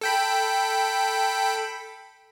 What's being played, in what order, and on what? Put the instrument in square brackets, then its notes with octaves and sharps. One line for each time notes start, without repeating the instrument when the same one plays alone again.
[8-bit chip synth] A4 G5 B5